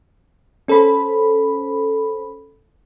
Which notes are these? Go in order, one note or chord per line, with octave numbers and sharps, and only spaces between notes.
C#4 A4 C5 B5